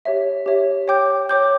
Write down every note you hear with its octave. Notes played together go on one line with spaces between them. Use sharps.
G4 C#5 E5
G4 C#5 E5
C#5 G5 D6 G6
C#5 G5 D6 G6